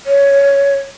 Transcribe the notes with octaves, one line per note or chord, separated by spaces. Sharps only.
C#5